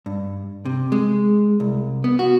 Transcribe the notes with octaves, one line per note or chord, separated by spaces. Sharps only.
G2
C3
G#3
C2
B3
F#4